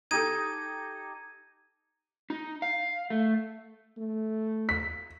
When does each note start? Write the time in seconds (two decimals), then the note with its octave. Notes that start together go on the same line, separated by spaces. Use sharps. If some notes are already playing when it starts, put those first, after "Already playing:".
0.11 D#4 G4 A4 G#6 D#7
2.30 D#4
2.62 F5
3.10 A3
3.98 A3
4.69 B6